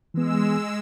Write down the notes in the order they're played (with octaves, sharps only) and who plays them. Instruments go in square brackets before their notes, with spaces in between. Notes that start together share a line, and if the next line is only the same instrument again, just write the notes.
[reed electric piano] E3 B3 [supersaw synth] G#3 E6